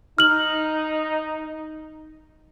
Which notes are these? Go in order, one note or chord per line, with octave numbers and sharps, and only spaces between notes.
D#4 F6 F#7